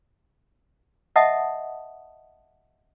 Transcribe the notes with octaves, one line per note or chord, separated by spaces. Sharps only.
D#5 E5 F#5 A5 D#6